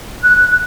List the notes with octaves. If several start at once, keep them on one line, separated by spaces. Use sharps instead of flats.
F#6